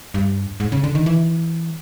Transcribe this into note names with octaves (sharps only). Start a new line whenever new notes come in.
G2
G#2
C#3
D3
D#3
E3